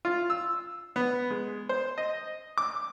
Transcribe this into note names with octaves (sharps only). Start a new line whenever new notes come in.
F4
E6
B3
G#3
C5
D#5
D6